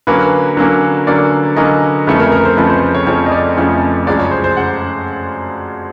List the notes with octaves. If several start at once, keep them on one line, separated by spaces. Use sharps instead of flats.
D3 F#3 A#3 C#4 B4
D3 F#3 A#3 C#4
D3 F#3 A#3 C#4 D5
D3 F#3 A#3 C#4 D#5
F2 C#3 F3 A3 C#4 B4
A#4
A#4
C5
F2 C#3 F3 A3 C#4 B4
C5
C#5
F2 C#3 F3 A3 C#4 C#5
D#5
D5
F2 C#3 F3 A3 C#4
F#2 C#3 F3 G#3 D5
C#5
C5
C5
C#3 F#5